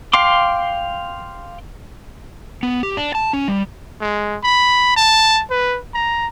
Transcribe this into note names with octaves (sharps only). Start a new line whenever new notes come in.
F5 G5 C6 D6
B3
G4
D4
A5
C#4
G3
G#3
B5
A5
B4
A#5